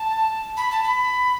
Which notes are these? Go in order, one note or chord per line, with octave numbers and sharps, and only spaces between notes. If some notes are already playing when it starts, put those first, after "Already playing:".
Already playing: A5
B5
A5
B5